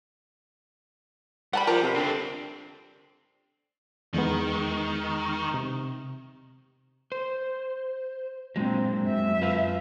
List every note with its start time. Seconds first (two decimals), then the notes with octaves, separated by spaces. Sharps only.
1.53 G3 F#5 A5 B5
1.67 F3 A#4 A5 A#5
1.83 C3
1.95 D3 C4 D4
4.14 E2 D#3 G#3 B3
5.54 C3
7.12 C5
8.56 A#2 F#3 G#3 C4 D4
9.04 F#2 E5
9.41 F4 B4 F5